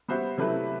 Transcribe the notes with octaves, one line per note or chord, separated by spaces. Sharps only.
G3 B3 F#4 C5 E5
C3 F#3 A3 E4 B4